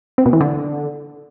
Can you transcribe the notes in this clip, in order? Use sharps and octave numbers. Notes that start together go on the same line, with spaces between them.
C4
B2
E3
D3